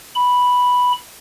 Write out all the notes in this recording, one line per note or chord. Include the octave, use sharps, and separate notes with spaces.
B5